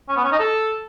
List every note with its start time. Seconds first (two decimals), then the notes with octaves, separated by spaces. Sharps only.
0.09 C#4
0.16 B3
0.24 C#4
0.32 D#4
0.39 A4